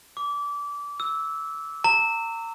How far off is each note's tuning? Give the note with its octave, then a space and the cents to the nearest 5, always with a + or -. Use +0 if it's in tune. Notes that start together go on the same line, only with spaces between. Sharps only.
D6 -25
E6 -10
A#5 -30